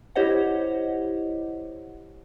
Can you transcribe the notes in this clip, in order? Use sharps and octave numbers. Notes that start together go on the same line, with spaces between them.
E4 G4 C5 C#5 D#5 F#5